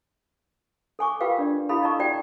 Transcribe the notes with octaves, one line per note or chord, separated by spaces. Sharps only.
A4 G#5 C#6 D6
F4 G4 A#4 B4 F5 G5
D4 D5
E4 G4 A4 F5 B5
D#5 F5 A5 A#5 C#6 E6
F#4 D5 G5